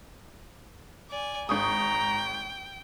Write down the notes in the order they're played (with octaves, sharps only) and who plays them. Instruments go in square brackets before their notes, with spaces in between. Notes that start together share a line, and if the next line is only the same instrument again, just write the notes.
[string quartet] D5 G#5
[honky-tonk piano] G#1 C#6 D#6 [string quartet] G5 [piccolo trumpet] A#5